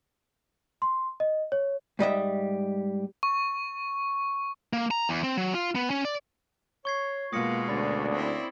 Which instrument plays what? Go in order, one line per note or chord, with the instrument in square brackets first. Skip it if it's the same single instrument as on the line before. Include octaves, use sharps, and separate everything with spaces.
[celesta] C6
D#5
C#5
[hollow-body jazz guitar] G#2 G3 D#5 E5
[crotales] C#6
[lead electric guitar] A#3
A#5
E2
C4
F#3
F4
B3
C#4
D5
[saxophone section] C#5 [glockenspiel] C#6 G#6 C7
[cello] B2 G#3 [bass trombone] A#3 [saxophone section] F4 [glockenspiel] D#6 A#6 C#7
[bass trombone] D2 [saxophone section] A#3 C#4 D5 [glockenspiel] B5 A6
[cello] C4 E4